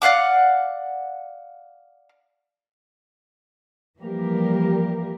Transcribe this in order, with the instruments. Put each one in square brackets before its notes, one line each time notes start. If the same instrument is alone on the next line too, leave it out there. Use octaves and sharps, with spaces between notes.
[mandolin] D5 F5 F#5 D6
[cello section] E3 F3 G3 A#3 G4 A#4